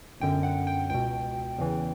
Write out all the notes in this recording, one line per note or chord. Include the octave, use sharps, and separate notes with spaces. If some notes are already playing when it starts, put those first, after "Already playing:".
G1 F#2 D3 G5
F#5
G5
C#2 B2 G5
E2 C#3 E3